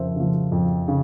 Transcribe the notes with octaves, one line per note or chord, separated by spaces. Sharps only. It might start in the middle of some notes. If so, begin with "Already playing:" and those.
Already playing: F2 C#3 F3 A#4 C5 E5
C#3 F3
F2
C#3